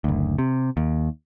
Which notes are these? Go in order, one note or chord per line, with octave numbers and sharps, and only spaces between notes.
F#1 D2
C3
D#2